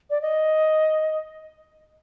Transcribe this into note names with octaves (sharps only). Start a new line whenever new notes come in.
D5
D#5